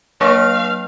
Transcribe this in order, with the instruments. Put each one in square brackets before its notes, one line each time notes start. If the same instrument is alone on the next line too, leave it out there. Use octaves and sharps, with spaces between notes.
[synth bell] F#3 A#3 D4 [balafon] C#5 C#6 [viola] F5